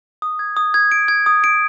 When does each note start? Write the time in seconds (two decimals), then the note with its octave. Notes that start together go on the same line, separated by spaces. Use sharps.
0.22 D#6
0.39 G#6
0.57 D#6
0.74 G#6
0.92 D7
1.08 G#6
1.26 D#6
1.44 D7